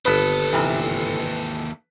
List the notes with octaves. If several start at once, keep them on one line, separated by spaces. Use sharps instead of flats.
G1 D#2 B3 A4 B4
G#2 C3 E3